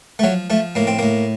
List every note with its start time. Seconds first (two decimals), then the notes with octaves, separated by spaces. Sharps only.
0.19 A3
0.23 F3 F#3
0.50 F3 A3
0.75 A2 A#3
0.87 C4
0.99 A2 A#3